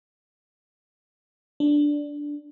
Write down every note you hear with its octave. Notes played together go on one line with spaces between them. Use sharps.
D4